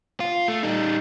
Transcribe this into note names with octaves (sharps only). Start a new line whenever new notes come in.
F4
A3
G3 D#4